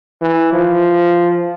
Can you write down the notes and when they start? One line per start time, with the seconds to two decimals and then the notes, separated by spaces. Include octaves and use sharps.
0.22 E3
0.52 F3